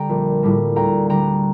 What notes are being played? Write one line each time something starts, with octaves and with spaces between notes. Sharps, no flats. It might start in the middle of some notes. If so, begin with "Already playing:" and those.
Already playing: D3 G3 G5 A#5
A#1
A2 G3 A#3
D2 G5 A#5
D3 G3 G5 A#5